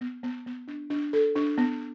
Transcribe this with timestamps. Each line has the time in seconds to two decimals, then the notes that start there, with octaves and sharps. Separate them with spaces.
0.01 B3
0.23 B3
0.46 B3
0.68 D4
0.90 D4
1.13 A4
1.36 D4
1.58 B3